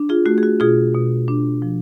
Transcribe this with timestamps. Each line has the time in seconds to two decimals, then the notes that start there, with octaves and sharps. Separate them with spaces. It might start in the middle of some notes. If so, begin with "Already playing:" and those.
Already playing: D4
0.09 F4 G#4
0.26 A3 F#4
0.38 G#4
0.43 F#4
0.60 B2 F4 G#4
0.94 B2
1.28 D4
1.62 F3